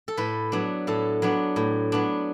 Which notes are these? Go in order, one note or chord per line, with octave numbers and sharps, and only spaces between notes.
A4
A2 B4
F#3 B3 D4
A2 A4
F#3 B3 D4
A2
F#3 B3 D4